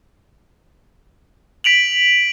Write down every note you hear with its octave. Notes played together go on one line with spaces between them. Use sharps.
B6 D7 F7 F#7